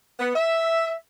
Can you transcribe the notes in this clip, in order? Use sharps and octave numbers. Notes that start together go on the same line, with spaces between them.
B3
E5